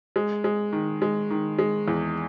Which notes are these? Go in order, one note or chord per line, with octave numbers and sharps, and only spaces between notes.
G#3
G#3
D#3
G#3
D#3
G#3
E2